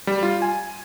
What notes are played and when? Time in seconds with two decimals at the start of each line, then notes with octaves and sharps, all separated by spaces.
0.07 G3
0.23 F4
0.42 G#5